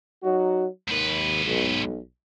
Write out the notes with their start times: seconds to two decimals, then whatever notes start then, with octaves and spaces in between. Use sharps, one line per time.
0.23 F#3 D#4 F#4
0.88 D#2 G#2 B4
1.45 B1